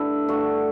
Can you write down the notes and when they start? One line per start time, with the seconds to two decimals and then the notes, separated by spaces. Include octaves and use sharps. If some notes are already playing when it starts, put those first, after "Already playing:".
Already playing: G2 D3 A3 E4
0.28 G2 D3 A3 F#4